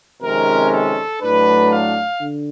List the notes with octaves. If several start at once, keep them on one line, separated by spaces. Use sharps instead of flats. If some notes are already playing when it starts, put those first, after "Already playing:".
F2 C3 D#3 G#3 C#4 A#4
A4
A2 F#3 A3 D4 B4
F5
D3